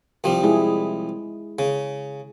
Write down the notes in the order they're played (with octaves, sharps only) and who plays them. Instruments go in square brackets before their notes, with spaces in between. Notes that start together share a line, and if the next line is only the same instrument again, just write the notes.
[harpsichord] C2 F3 G3
[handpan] G#3 E4 G#4
[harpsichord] C#3